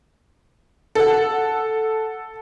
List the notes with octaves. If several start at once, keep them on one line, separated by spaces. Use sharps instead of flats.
A4 F#5